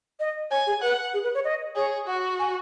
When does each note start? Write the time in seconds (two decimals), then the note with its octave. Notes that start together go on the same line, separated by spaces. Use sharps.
0.20 D#5
0.51 C#5 G#5
0.67 G#4
0.82 B4 F#5
1.14 G#4
1.24 B4
1.35 C#5
1.45 D#5
1.76 G#4 C#5
2.07 F#4 F#5
2.39 G#5